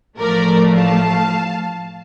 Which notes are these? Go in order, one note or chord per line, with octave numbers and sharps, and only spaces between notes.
A1 A2 F3 A3 A#4 D5
F5 A5